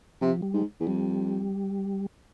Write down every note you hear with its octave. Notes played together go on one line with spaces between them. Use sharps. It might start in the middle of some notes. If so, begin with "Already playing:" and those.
C3 F3
G3
G#2
E2
F2 G3